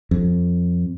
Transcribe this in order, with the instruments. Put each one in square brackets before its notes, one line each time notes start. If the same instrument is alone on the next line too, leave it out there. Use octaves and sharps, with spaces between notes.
[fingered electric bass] F2